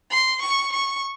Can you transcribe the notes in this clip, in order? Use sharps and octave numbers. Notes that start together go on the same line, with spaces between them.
C6
C#6
C#6